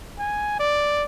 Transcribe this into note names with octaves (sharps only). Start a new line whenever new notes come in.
G#5
D5